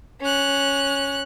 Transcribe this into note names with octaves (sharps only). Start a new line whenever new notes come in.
C#4 F#6